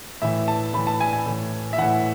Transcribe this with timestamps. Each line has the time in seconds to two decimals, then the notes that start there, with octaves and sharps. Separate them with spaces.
0.22 A2 E3 E5
0.48 A5
0.73 A2 E3 B5
0.87 A5
1.00 G#5
1.13 G#5
1.26 A2 E3
1.73 E5
1.78 A2 E3 F#5